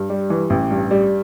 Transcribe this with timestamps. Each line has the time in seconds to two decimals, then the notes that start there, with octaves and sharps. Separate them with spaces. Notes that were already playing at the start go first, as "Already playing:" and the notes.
Already playing: G2
0.09 G3
0.30 E3
0.50 A1
0.71 G2
0.91 G3